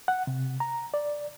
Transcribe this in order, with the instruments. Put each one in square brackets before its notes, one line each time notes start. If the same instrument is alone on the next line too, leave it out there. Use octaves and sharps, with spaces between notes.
[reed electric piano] F#5
C3
A#5
D5